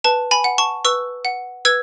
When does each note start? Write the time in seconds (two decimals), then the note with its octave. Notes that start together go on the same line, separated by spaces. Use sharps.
0.04 B4 A5
0.31 G#5 B5
0.44 F#5
0.58 A5 C#6
0.85 B4 C#6 E6
1.25 F#5
1.65 B4 E6 G#6